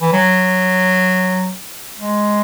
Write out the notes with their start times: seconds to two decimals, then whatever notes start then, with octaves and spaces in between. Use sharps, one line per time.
0.01 E3
0.13 F#3
1.99 G#3